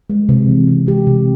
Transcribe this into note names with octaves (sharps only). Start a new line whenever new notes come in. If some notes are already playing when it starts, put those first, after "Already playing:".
G#3
C3
E3
C3
G#3 G4
C3